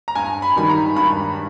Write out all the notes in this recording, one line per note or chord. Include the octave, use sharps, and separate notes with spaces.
A#5
G2 G#5
B5
D#3 G3 B5
A#5
G2 B5